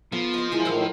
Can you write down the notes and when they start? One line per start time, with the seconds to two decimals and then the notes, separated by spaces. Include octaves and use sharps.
0.12 F3 B3 A4
0.34 C5 D#5
0.52 E3 G#3 A#4
0.65 A2 D#3 A#4 C5 F5 C6 E6